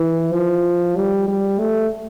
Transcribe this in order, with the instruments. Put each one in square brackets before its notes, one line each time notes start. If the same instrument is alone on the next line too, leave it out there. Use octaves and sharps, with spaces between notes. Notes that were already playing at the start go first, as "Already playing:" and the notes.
Already playing: [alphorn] E3
F3
G3
G3
A3